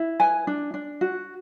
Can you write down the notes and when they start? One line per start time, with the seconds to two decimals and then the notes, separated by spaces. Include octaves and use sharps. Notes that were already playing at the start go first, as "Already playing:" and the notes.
Already playing: E4
0.20 B4 G#5
0.47 D4
0.74 D4
1.01 F#4